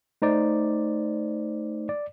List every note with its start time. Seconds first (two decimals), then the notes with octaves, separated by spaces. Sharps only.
0.22 A3 D#4 C5 D5
1.89 D5